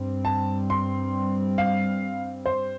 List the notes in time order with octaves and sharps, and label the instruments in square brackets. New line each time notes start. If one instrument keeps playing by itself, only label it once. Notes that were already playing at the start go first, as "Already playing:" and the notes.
Already playing: [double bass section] G2 G3 C4
[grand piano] A5
C6
F5
C5